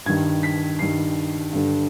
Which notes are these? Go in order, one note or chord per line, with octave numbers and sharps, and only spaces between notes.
G2 D#3 G#6
B6
G2 D#3 C7
G2 D3